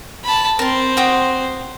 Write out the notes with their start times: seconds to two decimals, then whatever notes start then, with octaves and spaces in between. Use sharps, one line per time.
0.24 A5 B5
0.59 C4 A#4 C5 A5
0.97 F#4 G5 D#6